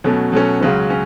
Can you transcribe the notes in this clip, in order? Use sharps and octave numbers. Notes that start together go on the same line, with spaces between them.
B2 F#3 A3 C#4
B2 F#3 A3 C#4
C#2 C#3 F#3 C#4
C#4